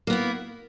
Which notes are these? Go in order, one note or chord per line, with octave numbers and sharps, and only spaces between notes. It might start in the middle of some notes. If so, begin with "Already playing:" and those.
A#3 B3 E4